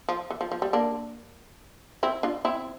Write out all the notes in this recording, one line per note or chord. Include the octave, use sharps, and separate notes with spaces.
F3
E3
F3
F3
G3
A#3 D4
C4 E4
D4 F4
C4 E4